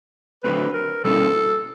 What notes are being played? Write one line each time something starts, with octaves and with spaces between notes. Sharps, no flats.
D3 F#3 A3 C4 B4
A#4
B2 G3 A#3 C#4 E4 A4